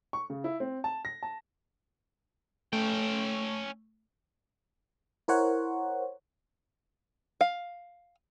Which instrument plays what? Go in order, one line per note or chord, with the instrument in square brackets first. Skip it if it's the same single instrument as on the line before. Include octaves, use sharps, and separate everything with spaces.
[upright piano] C#6
C#3
E4
C4
A5
A#6
A5
[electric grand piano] A3 [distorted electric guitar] C#4 G5
[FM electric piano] E4 A#4 C5 C#5 F#5
[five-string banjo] F5